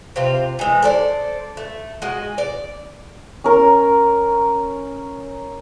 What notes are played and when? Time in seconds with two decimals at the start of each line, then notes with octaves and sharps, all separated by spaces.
0.16 C3 C4 F4
0.59 E3 G#3
0.83 A4 C5 D5
1.57 A3
2.02 G#3 F#4 D#5
2.38 D5
3.44 C#4 A#4